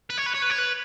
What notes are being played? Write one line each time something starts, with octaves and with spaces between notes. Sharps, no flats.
B4
C#5
B4
C#5
B4
C#5
B4